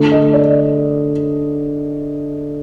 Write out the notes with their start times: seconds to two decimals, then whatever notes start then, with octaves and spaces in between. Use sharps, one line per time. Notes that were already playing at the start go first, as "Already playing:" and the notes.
Already playing: D3 A3
0.12 D#5
0.33 D5